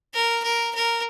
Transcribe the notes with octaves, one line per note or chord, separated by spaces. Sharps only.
A#4
A#4
A#4